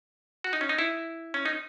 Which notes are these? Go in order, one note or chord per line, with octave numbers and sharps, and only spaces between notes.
F#4
D#4
C#4
D#4
E4
C#4
D#4